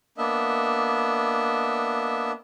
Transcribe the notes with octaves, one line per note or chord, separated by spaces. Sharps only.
A#3 B3 D4 D#5 E5